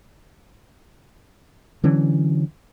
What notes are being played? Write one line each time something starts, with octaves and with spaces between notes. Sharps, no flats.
D3 E3 F#3 C#4